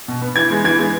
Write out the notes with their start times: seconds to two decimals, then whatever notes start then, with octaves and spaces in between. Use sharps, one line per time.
0.08 B2
0.22 B3
0.36 E3 G#6
0.50 G#3 B3
0.64 E3 G#6
0.79 G#3 B3